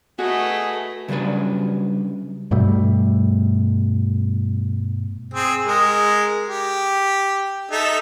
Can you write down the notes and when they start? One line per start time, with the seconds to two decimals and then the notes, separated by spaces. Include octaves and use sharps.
0.19 A3 F#4 G#4 B4 D#5
1.08 C#3 F#3 G3 D4 B4
2.51 G2 B2 G3 A3
5.34 C4 G#4
5.66 G#3 A#4
6.48 G4
7.71 D#4 A4 E5